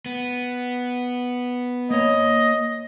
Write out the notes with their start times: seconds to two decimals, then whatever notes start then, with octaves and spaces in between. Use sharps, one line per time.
0.06 B3
1.90 A#3 C#5 D#5